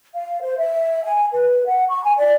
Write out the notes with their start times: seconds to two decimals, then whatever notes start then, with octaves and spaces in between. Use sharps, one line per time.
0.15 F5
0.42 C5
0.57 E5
1.04 G#5
1.33 B4
1.66 F#5
1.89 C#6
2.04 G#5
2.17 D5